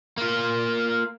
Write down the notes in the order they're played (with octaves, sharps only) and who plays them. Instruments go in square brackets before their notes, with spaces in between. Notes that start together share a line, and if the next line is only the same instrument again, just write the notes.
[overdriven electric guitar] A#3 F4